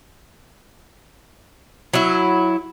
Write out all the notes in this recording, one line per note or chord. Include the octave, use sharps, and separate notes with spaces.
F#3 E4